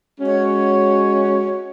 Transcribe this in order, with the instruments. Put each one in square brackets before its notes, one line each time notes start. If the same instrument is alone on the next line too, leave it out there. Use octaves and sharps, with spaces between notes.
[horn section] G#3 C#4 F#4 C#5